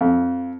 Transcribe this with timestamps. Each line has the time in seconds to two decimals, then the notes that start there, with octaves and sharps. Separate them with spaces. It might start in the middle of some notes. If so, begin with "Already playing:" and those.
0.01 F2